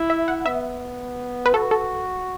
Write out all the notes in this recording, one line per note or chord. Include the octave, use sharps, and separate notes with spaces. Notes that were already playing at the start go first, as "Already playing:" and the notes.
Already playing: E4
E5
F#5
B3 E5
B4
F#4 A4
A4